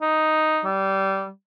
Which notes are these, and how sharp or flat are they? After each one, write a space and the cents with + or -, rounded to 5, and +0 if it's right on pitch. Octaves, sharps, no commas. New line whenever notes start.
D#4 +0
G3 -20